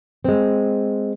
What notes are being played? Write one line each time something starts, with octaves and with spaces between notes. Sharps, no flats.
G#3 C4